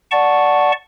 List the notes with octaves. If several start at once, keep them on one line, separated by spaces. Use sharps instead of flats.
D5 F#5 A5 C#6